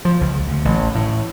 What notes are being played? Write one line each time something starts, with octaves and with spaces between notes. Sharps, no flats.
F3
C#2
D2
A1
A2